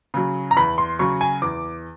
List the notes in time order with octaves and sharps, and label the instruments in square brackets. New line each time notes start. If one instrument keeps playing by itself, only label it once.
[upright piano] C#3 F#3
A#5
E2 B5
C6
C#3 F#3 C#6
G#5
E2 D6